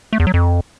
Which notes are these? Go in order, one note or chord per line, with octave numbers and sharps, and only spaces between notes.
A3
E2
F#3
F2